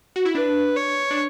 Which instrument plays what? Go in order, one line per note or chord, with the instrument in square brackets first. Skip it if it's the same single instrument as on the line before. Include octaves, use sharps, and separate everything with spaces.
[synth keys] F#4
E4
[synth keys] D4 [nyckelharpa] B4
[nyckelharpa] C#5
[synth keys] D4